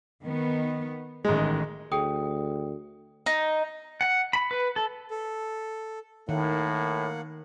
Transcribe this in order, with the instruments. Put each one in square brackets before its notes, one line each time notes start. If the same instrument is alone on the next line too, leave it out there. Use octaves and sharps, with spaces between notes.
[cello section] D#3 B3
[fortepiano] A1 G#3 [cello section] D#3
[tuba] D2 [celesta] G#4 G5 D#6
[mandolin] D#4
[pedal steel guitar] F#5
B5
B4
A4
[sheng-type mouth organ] A4
[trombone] A2 [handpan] D#3 [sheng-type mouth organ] A#3 F#5